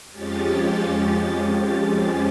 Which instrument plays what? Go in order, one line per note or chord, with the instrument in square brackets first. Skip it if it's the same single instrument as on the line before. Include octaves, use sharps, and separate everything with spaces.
[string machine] F2 F3 G#3 C#4 G4 A6